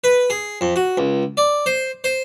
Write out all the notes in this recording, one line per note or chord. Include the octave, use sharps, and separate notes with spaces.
B4
G#4
F2
F#4
C#2
D5
C5
C5